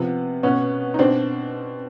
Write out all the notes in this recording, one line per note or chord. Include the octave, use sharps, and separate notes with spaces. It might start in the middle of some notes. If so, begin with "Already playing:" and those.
Already playing: C3 F3 B3
B2 B3 C#4
D#4
B2 C4 D4